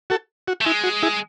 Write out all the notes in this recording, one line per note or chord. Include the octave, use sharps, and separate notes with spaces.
F#4 A4
F#4
A3
G#3 E4
F#4
E4 G#4